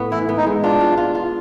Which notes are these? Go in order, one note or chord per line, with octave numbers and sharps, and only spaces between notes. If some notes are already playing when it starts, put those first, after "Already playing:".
Already playing: A2 B3
E3 E4
B3
D#4
G#3
D4 F4
F4
F4
F4